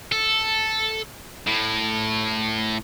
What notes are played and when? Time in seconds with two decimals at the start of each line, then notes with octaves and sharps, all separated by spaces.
0.12 A4
1.47 A2